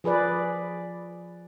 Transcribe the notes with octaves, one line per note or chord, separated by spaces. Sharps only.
F3 G#4 B4 D5